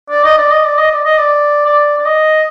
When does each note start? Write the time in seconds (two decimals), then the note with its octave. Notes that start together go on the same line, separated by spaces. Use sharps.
0.10 D5
0.24 D#5
0.38 D5
0.51 D#5
0.64 D5
0.78 D#5
0.91 D5
1.05 D#5
1.18 D5
1.66 D5
1.98 D5
2.05 D#5